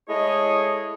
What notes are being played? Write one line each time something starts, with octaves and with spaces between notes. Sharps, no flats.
G#3 A3 E4 G#4 C#5 D#5